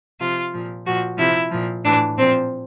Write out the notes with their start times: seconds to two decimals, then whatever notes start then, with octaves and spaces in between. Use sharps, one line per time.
0.19 C3 F3 F4
0.53 A#2 F3
0.86 A#2 F3 F#4
1.18 C3 F3 E4
1.51 A#2 F3
1.84 A2 E3 D4
2.17 A#2 F3 C4